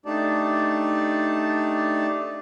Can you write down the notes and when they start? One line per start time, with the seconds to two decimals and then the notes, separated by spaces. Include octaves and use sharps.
0.06 A3 D4 D#4 G4 D5 A5